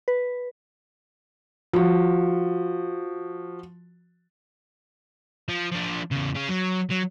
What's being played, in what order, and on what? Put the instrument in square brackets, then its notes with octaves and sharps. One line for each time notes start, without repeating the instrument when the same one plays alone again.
[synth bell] B4
[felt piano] F3 F#4
[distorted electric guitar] F3
F3 D4
E2 C#3
C#4 G#4
F#3
F#3